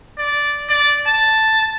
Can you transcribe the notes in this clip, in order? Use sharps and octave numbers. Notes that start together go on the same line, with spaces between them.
D5
D5
A5